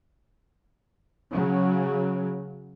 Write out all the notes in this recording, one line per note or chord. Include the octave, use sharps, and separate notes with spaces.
C#3 F#3